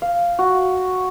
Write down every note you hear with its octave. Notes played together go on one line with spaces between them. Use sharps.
F5
F#4